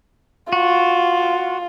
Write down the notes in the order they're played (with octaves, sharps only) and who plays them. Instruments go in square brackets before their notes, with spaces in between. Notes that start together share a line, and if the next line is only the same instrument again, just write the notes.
[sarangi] F4 [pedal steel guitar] F#4